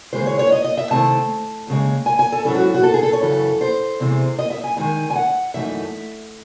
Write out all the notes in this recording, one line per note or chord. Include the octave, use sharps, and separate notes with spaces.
D#2 C#3 E3 G#3 C5
C#5
C#5
D#5
D#5
E5
C3 D#3 A3 C4 E4 A5
D#2 C#3 G#3
G#5
G#5
A4
G#2 F#3 C#4 E4 A4
F#4
F#4
A4
G#4
A4
C#5
F#2 C#3 E3 A4
C5
E2 C3 E3 G#3
D#5
E5
G#5
D#3 G#3 D#4 G#5
G#5
F#5
F#2 E3 A3 D#4 E5